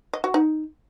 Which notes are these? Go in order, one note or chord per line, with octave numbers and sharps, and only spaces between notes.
D#5
F#4
D#4